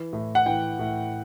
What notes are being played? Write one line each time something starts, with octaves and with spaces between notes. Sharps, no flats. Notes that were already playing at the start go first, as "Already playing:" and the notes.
Already playing: E3
A2
F#5
E3 G5
A2